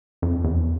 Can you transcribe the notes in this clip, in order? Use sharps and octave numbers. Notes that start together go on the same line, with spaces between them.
F2
E2